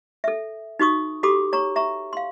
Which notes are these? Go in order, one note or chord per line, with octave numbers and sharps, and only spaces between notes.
A4 E5
D#4 F#4 C#6 D#6
F#4 G4 A4 B5 D6 D#6
C#5 A#5 C#6
E5 A#5 C#6
F5 C6